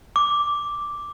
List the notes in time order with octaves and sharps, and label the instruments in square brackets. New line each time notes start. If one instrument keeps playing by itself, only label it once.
[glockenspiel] D6